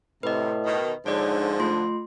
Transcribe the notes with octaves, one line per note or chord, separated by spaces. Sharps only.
A2 C3 B4 D#5
B2 D#3
G#2 D3 F3 C#5 D5
A3 F4 C6